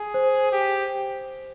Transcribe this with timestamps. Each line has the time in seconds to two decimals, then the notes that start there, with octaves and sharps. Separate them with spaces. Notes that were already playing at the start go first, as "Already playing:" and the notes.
Already playing: G#4
0.14 C5
0.52 G4